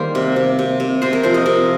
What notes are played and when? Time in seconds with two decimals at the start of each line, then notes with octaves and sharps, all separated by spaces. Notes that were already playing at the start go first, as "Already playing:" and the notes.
Already playing: D#3 G3 A#3 C5
0.15 C3
0.36 C3
0.59 C3
0.80 C3
1.02 C3 C5
1.13 A#4
1.23 F3 C5
1.34 D#5
1.46 C3 A#4